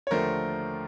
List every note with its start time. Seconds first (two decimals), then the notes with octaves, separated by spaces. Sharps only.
0.07 C#5
0.11 D#2 D3 F3 A3 A#4 C5